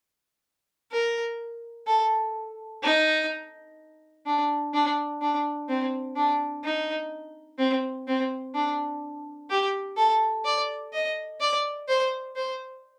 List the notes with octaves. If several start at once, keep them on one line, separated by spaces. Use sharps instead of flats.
A#4
A4
D#4
D4
D4
D4
C4
D4
D#4
C4
C4
D4
G4
A4
D5
D#5
D5
C5
C5